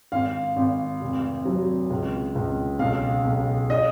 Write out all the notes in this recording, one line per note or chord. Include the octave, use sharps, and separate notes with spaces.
G#1 F5
G#1
F1
F#3
C#2
C#2
B1 F5
B1
D#5